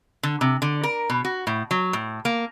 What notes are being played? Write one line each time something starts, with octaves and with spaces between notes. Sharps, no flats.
D3
C3
D3
A#4
B2
F#4
A2
F#3
A2
A#3